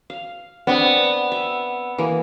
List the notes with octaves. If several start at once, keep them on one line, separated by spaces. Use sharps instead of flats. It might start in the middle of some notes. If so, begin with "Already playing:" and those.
F5
B3 C4 D4
E5
E3 A#3